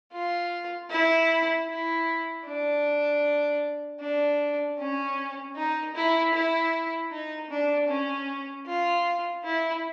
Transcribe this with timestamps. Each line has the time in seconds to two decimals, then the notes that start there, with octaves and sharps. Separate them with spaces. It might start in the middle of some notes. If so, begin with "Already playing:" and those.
0.13 F4
0.90 E4
1.67 E4
2.46 D4
4.00 D4
4.78 C#4
5.56 D#4
5.95 E4
6.34 E4
7.11 D#4
7.50 D4
7.88 C#4
8.66 F4
9.44 E4